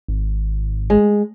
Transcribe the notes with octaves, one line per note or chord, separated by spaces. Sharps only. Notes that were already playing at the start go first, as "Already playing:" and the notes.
G#1
G#3